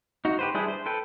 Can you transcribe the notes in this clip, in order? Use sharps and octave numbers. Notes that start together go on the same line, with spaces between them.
D#4 F#4
G4 B4 C5
G3 D4 E4 G#4 C5
C5
A4 B4 G5